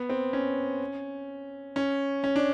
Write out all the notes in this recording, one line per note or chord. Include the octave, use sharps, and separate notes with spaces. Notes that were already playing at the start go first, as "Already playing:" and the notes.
Already playing: B3
C4
C#4
C#4
C#4
D4